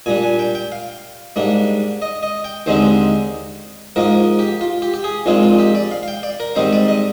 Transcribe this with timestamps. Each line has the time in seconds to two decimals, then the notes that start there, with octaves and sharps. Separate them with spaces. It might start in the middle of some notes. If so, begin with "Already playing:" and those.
0.06 A#2 G3 D4 G#5
0.23 G#5
0.39 G5
0.55 G5
0.72 F5
1.36 G#2 G3 A#3 D4
2.02 D#5
2.23 D#5
2.44 G5
2.66 D#2 D3 G#3 C4 D#4 C5
3.96 G#2 F3 A#3 D#4 A#4
4.39 G4
4.61 F4
4.82 G4
4.94 G4
5.04 G#4
5.26 A#1 A#2 G#3 C4 D#4 F4
5.43 F4
5.59 G4
5.75 D5
5.91 F5
6.03 F5
6.08 G5
6.23 D5
6.40 A#4
6.56 G#2 D#3 G3 C4 D#4 C5
6.73 D5
6.88 D#5